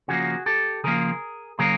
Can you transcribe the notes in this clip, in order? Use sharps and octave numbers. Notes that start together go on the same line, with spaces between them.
C#3 F3 A#3 F#4 G#4
G4 A4
C#3 F3 A#3 G#4 A#4
C#3 F#3 A#3 G#4 A#4